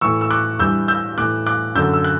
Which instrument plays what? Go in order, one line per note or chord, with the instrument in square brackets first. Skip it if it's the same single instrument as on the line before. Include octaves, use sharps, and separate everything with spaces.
[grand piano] A2 E3 C#6 E6
E6
D6 F#6
G2 E3 E6 G6
E6 G6
A2 E3 D6 F#6
D6 F#6
F#2 D3 E6 G6
E6
F#6